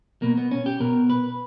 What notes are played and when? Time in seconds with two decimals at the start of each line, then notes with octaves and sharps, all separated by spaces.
0.22 B2 A#3
0.38 B3
0.51 C#4
0.66 G4
0.80 B2 A#4
1.10 B4